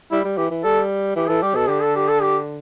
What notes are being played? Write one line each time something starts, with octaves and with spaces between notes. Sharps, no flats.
G3 E4
G3
E3 G4
E3
G3 A4
E3 G4
E3 A4
G3 G4
B2 A4
D3 G4
A4
G4
A4
G4